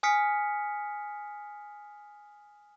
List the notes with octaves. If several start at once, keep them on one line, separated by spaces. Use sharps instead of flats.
G#5 D#6 F6 B6 C#7